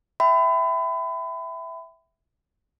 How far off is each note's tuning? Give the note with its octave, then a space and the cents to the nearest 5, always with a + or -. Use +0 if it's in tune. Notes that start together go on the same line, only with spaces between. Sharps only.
E5 +0 G5 -25 B5 +35